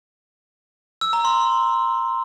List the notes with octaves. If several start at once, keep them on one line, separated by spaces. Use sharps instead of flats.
E6
A#5
C6